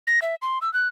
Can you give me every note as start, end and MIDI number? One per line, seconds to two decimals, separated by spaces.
0.07 0.20 94
0.22 0.35 76
0.42 0.59 84
0.62 0.72 88
0.74 0.88 90